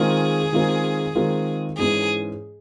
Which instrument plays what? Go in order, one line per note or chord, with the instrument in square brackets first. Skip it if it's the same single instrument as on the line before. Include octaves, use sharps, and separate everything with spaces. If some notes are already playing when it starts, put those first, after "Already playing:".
Already playing: [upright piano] D#3 G#3 C4 F4 A#4 [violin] G#4
[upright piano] D#3 G#3 C4 F4 A#4
D#3 G#3 C4 F4 A#4
[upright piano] G#2 E3 G#3 C#4 [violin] G#4